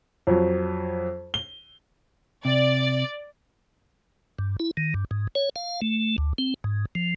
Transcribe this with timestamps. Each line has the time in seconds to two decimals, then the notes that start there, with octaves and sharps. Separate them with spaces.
0.27 F2 F3 F#3
1.34 G7
2.45 C3 D5
4.39 G2
4.60 E4
4.77 D#3
4.94 G2
5.11 G#2
5.35 C#5
5.56 F5
5.82 A3
6.18 D2
6.38 C4
6.64 G#2
6.95 F3